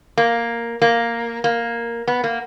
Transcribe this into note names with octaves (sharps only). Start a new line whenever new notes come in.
A#3
A#3
A#3
B3
A#3